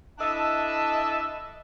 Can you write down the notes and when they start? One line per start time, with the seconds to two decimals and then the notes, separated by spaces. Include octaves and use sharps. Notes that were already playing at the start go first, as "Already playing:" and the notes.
0.19 D4 E4 A4 D#5 E5 A5